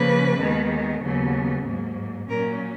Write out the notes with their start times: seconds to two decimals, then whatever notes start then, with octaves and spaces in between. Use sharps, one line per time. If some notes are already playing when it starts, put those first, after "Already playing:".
Already playing: C#3 F3 A#3 C#4 B4
0.40 D#2 D#3 G#3 B3
1.02 D#2 C#3 F#3 B3
1.66 G#2 F#3 A#3
2.28 A#2 F#3 C#4 A#4